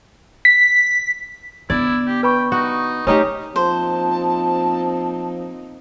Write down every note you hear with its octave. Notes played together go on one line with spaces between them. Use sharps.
B6
D3 B3 E4 D5 G#6
G4
B4 G5 B5 C#6
D#4 F#4
A3 C#4 D#4 G4 D#5
F3 A#3 C4 D#4 C5 A5